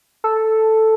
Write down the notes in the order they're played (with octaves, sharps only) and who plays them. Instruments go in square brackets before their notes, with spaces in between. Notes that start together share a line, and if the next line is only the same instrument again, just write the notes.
[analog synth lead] A4